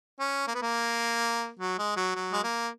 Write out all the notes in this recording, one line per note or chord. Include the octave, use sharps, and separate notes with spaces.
C#4
A#3
B3
A#3
F#3
G#3
F#3
F#3
G#3
A#3